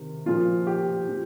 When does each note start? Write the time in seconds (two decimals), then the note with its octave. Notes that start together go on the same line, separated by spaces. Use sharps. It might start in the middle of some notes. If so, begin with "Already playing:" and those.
Already playing: C3 D#3
0.26 A#2 F3 F4
0.67 G4
1.09 F3